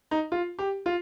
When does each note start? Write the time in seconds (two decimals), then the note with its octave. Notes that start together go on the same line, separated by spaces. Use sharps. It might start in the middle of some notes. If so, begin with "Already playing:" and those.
0.11 D#4
0.32 F4
0.59 G4
0.86 F4